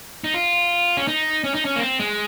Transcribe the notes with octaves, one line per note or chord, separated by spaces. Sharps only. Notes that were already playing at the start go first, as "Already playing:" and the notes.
D#4
F4
C#4
D#4
C#4
D#4
C#4
A#3
C4
G#3